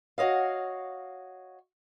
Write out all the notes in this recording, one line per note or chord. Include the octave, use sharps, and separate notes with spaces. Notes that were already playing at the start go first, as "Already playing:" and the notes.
F#4 C#5 D#5 F5